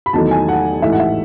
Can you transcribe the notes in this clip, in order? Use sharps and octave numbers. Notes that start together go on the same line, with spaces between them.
B5
E2 D#3 F#3 A3 A5
G#5
F#5
A1 G#2 E3 A3 E5
F#5
E5